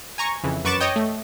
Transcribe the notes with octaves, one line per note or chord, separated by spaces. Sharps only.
G#5 A#5 C#6
F2 C#3 E3
F#2 B4 C#6 D6 A6 E7
C#5 D#5 G5
A3